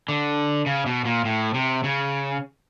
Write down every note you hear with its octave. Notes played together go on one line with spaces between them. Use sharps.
D3
C#3
B2
A#2
A2
C3
C#3